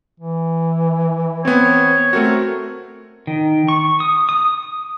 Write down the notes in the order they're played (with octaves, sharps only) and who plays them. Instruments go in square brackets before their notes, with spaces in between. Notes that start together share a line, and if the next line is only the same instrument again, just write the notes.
[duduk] E3
[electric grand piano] B3 C4 [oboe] C#5
[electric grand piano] A3 C4 F#4 [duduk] A#4
[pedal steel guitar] D#3
C#6
D#6
D#6